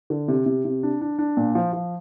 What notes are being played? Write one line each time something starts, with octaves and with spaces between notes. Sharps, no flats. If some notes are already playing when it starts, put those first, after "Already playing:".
D3
C3
C3
C3
D4
D4
D4
A#2
F3
F3